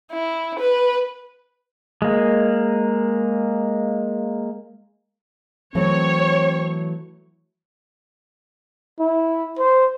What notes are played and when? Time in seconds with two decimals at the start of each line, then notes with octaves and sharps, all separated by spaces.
0.12 E4
0.59 B4
2.02 G#3 A#3
5.75 E3 F#3 A3 C4 C#5
9.00 E4
9.59 C5